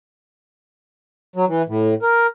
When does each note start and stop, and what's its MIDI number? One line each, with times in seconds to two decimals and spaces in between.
1.36 1.45 54
1.48 1.62 52
1.68 1.94 45
2.02 2.27 70